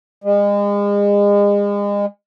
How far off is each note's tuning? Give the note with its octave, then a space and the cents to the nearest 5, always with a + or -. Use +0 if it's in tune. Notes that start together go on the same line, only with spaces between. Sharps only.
G#3 -35